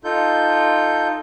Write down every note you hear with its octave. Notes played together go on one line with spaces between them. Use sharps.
D#4 F4 A4 G6